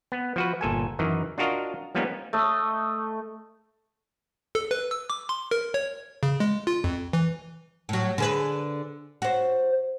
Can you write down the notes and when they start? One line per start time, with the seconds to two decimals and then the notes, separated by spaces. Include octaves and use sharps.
0.12 B3
0.36 F3 F#4 B4
0.61 G1 A#2 A4 G#5
0.99 F#2 D#3 E3
1.38 D4 F4 F#4 A#4 D#5 F5
1.95 F3 G3 A#3 B3 C#4 D#4
2.33 A3 D#5
4.55 A4
4.71 B4
4.91 E6
5.10 D6
5.29 C6
5.51 A#4
5.74 C#5
6.23 C#3
6.40 G#3
6.67 F4
6.84 F2
7.13 E3
7.89 A2 F#3
8.18 D3 G#4 B4
9.22 F#4 C5